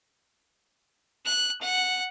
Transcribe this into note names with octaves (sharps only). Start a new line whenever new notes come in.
F#6
F#5